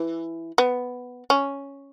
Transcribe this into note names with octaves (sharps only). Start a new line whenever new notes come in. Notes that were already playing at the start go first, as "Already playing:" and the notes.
Already playing: E3
B3
C#4